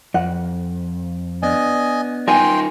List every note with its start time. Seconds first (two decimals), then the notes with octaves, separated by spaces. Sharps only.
0.14 F2 F#5
1.43 B3 D4 D5 D#5 G#5
2.28 D#4 F4 A#4 G5 G#5 C6